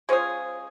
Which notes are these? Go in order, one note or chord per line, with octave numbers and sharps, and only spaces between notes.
G#3 C#4 F4 G#4 C5